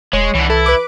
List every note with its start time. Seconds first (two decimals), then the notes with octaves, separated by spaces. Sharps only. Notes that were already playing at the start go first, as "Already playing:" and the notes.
0.13 E1 G#3 C#5
0.35 C2 D3 E3
0.50 E3 E4 A4
0.66 B4 D6